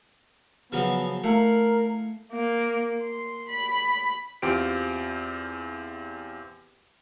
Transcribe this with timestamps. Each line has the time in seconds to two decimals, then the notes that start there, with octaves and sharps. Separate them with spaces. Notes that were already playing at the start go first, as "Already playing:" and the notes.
0.72 C#3 F3 F#3 B3 F6
1.24 A3 E4 A#4 F5 F#5
2.32 A#3
3.01 C6
3.49 B5
4.42 E2 C4 F4 G4 D7